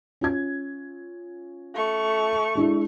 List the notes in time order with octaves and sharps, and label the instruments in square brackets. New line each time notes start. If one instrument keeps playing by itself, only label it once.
[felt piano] C#4 F4 G#6
[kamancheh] A3 C#6
[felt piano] G#3 D4 E4